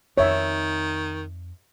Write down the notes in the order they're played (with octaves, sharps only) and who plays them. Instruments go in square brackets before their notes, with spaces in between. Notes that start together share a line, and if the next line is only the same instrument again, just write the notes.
[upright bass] F2 D#4 [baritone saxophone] D#3 [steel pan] C#5 E5